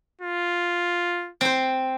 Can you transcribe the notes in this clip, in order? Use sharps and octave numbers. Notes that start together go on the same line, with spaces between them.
F4
C4 C5